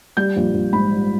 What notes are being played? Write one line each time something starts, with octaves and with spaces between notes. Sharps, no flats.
G3 G6
A#1
A#1
G#2 B5
G3